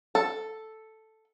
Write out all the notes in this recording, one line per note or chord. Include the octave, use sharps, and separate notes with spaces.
A4